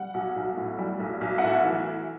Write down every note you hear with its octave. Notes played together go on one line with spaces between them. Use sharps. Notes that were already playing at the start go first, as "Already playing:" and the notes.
Already playing: G3 F#5
B1
B1
A2
G3
B1
B1
F#5
A2 E5
E3